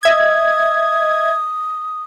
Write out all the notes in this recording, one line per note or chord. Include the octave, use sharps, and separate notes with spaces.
D#5 E5 D#6 G#6